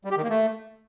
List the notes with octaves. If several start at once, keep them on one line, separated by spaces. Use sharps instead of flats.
G3
G4
D#3
A#3
A3